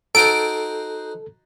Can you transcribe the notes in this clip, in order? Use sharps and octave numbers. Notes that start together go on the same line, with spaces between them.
D#4 F#4 A4 C5 D7